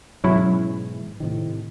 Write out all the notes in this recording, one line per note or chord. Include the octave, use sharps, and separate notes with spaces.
G#2 B2 E3 F#3 C#4 E4
A2 C3 D#3